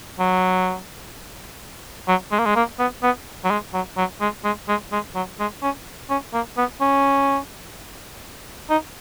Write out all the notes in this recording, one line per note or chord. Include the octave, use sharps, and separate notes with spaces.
F#3
F#3
G#3
A#3
G#3
A#3
B3
B3
F#3
G#3
F#3
F#3
G#3
G#3
G#3
G#3
F#3
G#3
C#4
C#4
A#3
B3
C#4
D#4